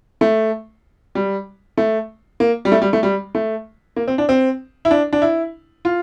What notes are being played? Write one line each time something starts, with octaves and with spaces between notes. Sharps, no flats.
A3
G3
A3
A#3
G3
A3
G3
A3
G3
A3
A#3
C4
D4
C4
E4
D4
D4
E4
F4